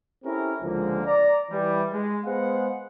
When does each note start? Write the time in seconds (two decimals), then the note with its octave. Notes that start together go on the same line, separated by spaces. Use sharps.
0.23 C4 C#4 E4 G4 A4 A#4
0.62 C#2 D3 F3 G#3 A#3
1.05 D5 A#5
1.50 E3 G3
1.92 G#3
2.24 G#3 B3 G#4 C5 F5 F#5